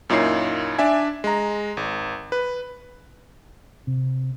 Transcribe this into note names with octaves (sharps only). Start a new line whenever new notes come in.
F#2 A#2 D#4 E4 C#5 C7
D4 D5 E5 G#5
G#3 A#5
G#1
B4
C3